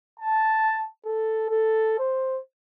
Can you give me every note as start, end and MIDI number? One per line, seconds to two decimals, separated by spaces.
0.20 0.85 81
1.06 1.47 69
1.50 1.99 69
1.99 2.40 72